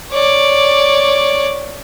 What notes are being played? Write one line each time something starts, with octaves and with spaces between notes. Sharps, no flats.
C#5 D5